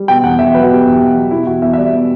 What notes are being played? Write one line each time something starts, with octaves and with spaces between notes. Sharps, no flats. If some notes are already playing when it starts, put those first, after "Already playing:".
Already playing: G3
B2 G5
E2 F#5
E2 E5
F#3 B4
F#4
B2 G4
E2
E2
F#3
B2 E4
E2 F#4
E2 E5
E5
G3 D5
B2